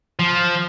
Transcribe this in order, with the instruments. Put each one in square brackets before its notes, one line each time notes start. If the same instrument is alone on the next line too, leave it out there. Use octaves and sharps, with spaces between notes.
[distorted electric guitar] F3